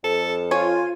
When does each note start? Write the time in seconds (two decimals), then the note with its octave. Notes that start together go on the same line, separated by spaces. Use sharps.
0.04 F2 A4
0.51 F4 C#5 G#5